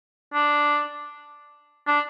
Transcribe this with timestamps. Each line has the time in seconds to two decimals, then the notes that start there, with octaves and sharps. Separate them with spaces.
0.34 D4
1.87 D4